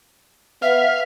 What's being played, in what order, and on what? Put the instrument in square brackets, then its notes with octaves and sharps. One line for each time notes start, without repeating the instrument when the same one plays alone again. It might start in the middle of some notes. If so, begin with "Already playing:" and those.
[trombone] B3 [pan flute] E5 [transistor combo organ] F5